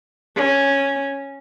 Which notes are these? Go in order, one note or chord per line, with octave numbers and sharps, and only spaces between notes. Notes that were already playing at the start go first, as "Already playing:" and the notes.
C#4